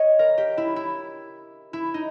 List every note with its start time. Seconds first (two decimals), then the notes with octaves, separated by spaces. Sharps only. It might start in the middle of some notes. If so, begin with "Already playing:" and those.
Already playing: C#5 D#5
0.19 A#4
0.38 G4
0.57 E4
0.76 E4
1.73 E4
1.94 D#4